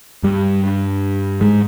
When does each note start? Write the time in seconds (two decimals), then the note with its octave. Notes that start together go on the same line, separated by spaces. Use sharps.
0.23 G2 G3
1.41 G#2 G#3